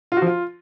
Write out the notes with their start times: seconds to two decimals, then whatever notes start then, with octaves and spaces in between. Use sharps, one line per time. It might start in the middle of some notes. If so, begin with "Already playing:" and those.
0.12 F4
0.17 F#4
0.22 F3
0.27 F4